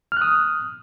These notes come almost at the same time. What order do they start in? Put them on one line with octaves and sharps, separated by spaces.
F6 F#6 D#6